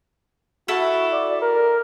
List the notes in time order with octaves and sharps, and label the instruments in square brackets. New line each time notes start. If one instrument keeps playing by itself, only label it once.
[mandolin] E4 A4 [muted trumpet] F#4
[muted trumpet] D5
A#4